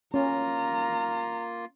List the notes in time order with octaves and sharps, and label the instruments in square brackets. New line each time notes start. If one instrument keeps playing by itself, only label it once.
[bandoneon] A#3 F4 [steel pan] C#4 [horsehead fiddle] A#5